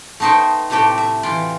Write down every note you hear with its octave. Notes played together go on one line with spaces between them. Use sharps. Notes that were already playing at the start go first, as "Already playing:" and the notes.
A3 B3 D#4 C5 E5 G5
A2 C3 A3 G4 G5
E5
E3 F4 G5